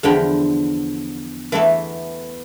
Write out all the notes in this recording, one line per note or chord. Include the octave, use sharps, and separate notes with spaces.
E2 D3 F3 G5 B5
E3 A3 B3